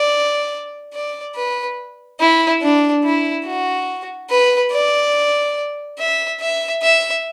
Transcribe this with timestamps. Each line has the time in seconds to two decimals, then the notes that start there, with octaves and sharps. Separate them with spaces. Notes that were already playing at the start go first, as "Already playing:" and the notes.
Already playing: D5
0.93 D5
1.35 B4
2.20 E4
2.62 D4
3.04 E4
3.46 F#4
4.30 B4
4.72 D5
5.99 E5
6.41 E5
6.82 E5